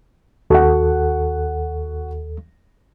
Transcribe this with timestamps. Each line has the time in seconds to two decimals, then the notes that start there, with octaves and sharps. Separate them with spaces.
0.50 D#2 F#4 A4 F#5